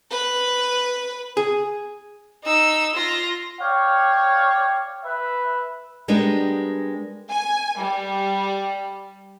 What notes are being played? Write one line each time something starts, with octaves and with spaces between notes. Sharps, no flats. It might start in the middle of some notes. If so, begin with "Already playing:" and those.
B4
G#4
D#4 E6
F4 A#6
C#5 D5 F5 G5
B4 E5
G3 G#3 B3 D4 G4 A#4
G#5
G3